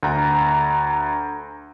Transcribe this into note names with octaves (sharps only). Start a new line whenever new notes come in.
D2 A#5